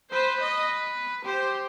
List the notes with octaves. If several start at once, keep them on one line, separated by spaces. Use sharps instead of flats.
B4 C5
D#5
G4 C5